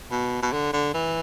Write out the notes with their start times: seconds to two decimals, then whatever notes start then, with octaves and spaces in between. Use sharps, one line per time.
0.11 B2
0.42 B2
0.53 D3
0.73 D3
0.94 E3